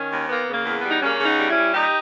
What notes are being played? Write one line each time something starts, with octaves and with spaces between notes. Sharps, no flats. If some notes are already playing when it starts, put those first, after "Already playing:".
Already playing: D#3 C#4
D#2
A#3 B3
C#3
A#3
E2
B3
G3
D#4
C#3 A#3 C#4
C#3
B3 D#4
G3
C#4 E4
G3
A#2 D#4 G4